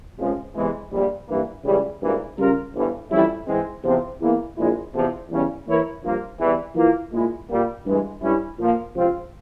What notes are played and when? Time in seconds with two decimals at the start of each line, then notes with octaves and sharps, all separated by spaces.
0.19 C#2 C3 F3 G#3
0.56 E2 C3 E3 G#3
0.92 A#1 A#2 G3
1.28 G2 E3 A#3
1.65 C#2 C#3 E3 G3
2.01 G#1 G2 E3 A#3
2.38 C#3 G3 C#4 F4 A#4
2.75 G1 G2 E3
3.11 F2 E3 G3 C#4 E4
3.48 G#2 E3 G#3 C4
3.83 E2 C3 F3 C4
4.20 E2 E3 A#3
4.57 A#1 A#2 G#3 E4
4.94 E2 C3 F3
5.30 E2 C#3 G3 C#4
5.66 E3 A#3 E4 A#4 C#5
6.03 G2 F3 A#3 F4
6.40 E2 E3 G3
6.75 E3 A#3 F4
7.12 A#2 G#3 E4
7.49 A#2 G3 A#3
7.86 G2 E3 G#3
8.22 G2 G3 C#4 E4
8.58 A#2 F3 A#3
8.95 C#2 C3 F3 C4 F4